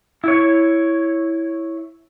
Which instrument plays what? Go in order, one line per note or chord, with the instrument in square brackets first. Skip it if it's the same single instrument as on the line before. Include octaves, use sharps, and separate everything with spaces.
[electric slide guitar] E4 C#5